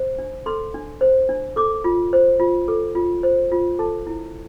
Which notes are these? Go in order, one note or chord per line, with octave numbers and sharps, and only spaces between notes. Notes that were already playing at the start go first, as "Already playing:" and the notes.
Already playing: C5
D4
A4 C6
D4
C5
D4
A4 D6
F4
C5
F4
A4
F4
C5
F4
A4 A5
E4